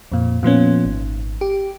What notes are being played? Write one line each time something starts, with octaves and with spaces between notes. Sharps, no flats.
F2 A#2
A#2 F3 B3 C#4
G#1
G4